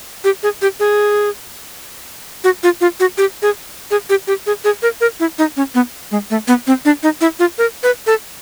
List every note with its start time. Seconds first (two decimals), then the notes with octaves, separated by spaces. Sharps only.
0.24 G4
0.43 G#4
0.62 G4
0.80 G#4
2.44 F#4
2.63 F4
2.81 F4
3.00 F#4
3.18 G4
3.42 G#4
3.91 G#4
4.09 G4
4.27 G4
4.47 G#4
4.64 G#4
4.82 A#4
5.01 A#4
5.20 E4
5.39 D#4
5.57 C#4
5.75 B3
6.11 G#3
6.30 A3
6.48 B3
6.67 C4
6.85 D4
7.03 D#4
7.21 E4
7.39 F4
7.58 A#4
7.83 B4
8.07 A4